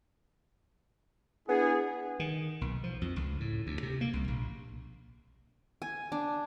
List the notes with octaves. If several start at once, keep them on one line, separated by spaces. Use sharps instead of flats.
B3 D4 E4 G#4
D#3
B1
F3
F2
C#2
A2
D2
C3
A#3
C2
A#1
G#5
D4